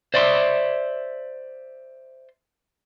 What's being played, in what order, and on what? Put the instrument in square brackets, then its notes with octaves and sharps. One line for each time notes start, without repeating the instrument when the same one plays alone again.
[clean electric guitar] C5 D5 E5 C6